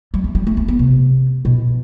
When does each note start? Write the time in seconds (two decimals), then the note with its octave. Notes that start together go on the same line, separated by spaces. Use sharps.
0.14 G3
0.24 A3
0.35 G3
0.47 A3
0.57 A3
0.68 B3
0.79 C3
1.45 B2